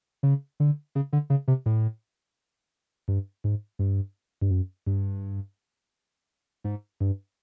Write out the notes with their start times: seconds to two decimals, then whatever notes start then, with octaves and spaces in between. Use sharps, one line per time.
0.23 C#3
0.60 D3
0.95 C#3
1.13 D3
1.30 C#3
1.48 C3
1.66 A2
3.08 G2
3.44 G#2
3.79 G2
4.41 G2
4.50 F#2
4.86 G2
6.64 G#2
7.01 G2